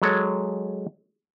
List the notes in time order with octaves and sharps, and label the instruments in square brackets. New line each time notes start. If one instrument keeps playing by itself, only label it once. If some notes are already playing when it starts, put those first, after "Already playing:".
[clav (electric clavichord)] F#3 G#3 A4 C#5